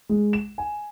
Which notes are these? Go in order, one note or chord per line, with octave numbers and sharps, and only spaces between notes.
G#3
E7
G#5